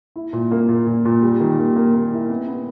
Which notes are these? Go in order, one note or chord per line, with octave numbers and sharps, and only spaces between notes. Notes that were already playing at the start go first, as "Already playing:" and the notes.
E4
A#2
A#3
A#2
A#2
A#2
G3
D#3
A#3
A#3
A#3
E4
B3
B3